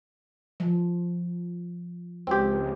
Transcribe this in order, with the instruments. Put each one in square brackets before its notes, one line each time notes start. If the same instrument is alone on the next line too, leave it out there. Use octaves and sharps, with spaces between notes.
[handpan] F3
[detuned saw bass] C#2 [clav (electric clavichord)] C4 G4